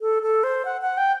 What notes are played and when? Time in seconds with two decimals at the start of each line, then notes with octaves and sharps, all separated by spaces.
0.01 A4
0.22 A4
0.43 C5
0.65 F#5
0.81 F#5
0.97 G5